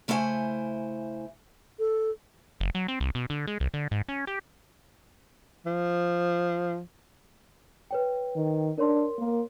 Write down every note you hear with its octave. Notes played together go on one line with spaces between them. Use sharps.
C#3 A3 E4 C5 E5 G#5
A4
F#1
F#3
C4
C2
B2
D3
G#3
C2
D3
G#2
C#4
G4
F3
B4 C#5 G5
D#3
D4 A#4 C#5 C6
A#3